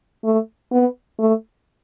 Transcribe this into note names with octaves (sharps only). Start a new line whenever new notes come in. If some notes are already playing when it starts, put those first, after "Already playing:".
A3
B3
A3